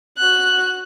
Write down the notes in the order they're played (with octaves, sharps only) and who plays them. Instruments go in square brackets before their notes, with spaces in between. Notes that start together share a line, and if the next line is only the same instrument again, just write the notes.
[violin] F#4 F#6